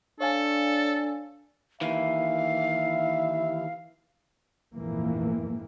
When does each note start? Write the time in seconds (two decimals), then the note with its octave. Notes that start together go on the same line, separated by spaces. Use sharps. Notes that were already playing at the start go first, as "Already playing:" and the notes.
0.20 D4 A4 C#5 F5 G#5
1.81 D#2 E3 E5 F5
4.74 A#1 F2 G#2 E3 A#3